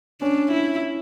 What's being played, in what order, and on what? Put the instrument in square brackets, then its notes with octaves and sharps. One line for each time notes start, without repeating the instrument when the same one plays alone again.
[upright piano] C#4 [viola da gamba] D4
[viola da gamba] E4